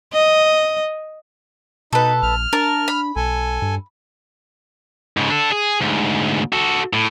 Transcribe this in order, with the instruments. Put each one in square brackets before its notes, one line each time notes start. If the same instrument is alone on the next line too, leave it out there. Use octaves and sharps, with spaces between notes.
[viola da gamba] D#5
[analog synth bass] B2 [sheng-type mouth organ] D#4 [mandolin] A4 B4
[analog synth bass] A#1 [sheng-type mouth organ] F6
[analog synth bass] D4 [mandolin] A#4 A5
[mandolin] B5
[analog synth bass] B1 [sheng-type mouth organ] A4 G#5
[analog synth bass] G2
[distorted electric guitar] G#2 C#3
D4 A4
G#4
D2 G#2
F#4 A4
A2